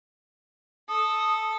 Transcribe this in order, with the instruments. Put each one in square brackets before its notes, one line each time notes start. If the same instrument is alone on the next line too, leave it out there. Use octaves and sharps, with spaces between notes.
[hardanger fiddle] A4 [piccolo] D#6